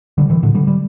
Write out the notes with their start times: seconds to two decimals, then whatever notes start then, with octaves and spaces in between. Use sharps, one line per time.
0.18 D3 G3
0.30 C3 E3
0.43 A2 D3
0.55 D3 G3
0.67 G3